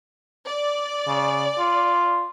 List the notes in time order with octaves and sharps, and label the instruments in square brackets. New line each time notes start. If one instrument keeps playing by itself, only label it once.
[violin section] D5
[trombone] C#3
F4